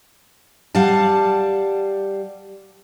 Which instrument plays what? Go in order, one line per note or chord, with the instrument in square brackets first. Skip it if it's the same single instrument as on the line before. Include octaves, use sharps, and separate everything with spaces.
[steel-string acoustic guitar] G3 F5 F#5 A5